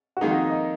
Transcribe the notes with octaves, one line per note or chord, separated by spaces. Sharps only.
F#4
F2 D#3 A#3 D#4 G#4
F#4
D#5